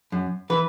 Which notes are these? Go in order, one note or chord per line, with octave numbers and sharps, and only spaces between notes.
F#2
E3 B4